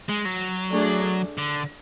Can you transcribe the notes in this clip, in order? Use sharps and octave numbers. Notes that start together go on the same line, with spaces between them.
G#3
F#3
A3 D4 G#4 D5
D3